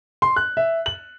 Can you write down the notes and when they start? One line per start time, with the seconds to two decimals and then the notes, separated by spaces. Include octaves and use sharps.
0.22 C6
0.36 F#6
0.57 E5
0.86 F#7